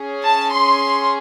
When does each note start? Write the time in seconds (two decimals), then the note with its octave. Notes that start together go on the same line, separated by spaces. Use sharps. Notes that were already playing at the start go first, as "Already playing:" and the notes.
Already playing: C#4 G#4
0.22 A5
0.51 C6